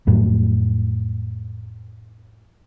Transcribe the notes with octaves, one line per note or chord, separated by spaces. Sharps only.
F2 A2 F#3